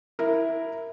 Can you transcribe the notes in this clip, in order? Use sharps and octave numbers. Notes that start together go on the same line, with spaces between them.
E4 A#4